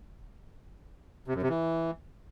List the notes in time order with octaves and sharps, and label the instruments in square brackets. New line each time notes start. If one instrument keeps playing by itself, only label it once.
[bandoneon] C3
F#2
C3
E3